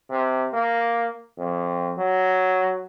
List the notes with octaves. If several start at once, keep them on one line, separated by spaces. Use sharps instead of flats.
C3
A#3
F2
F#3